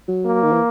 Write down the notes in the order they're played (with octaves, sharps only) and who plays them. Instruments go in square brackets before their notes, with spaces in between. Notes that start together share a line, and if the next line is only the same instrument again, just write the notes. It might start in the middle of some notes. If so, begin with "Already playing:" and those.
[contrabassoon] F#3
[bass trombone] A#3
[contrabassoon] D#3
E3